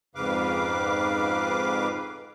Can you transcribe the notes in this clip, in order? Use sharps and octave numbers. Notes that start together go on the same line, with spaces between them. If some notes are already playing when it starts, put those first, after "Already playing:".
F2 G#2 C#3 B4 F5 D6